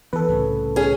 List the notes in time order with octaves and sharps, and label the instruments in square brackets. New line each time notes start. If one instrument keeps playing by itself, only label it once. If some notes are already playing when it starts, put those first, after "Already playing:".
[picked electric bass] E3 B3 [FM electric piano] A4 B4
[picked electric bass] C2 A2 C#3
[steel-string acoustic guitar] C#4 G#4